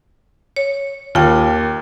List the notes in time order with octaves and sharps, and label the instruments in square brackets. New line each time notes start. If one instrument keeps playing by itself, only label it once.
[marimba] C#5
[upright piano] D#2 [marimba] F4 G5